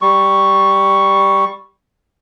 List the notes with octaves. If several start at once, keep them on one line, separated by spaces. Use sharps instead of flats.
G3 C#6